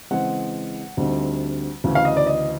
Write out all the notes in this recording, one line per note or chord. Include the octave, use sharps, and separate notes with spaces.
C#3 E3 G#3 C4 F#5
D2 D3 G3 C4 D#4
D2 C#3 E3
F5
D#5
D5
D#5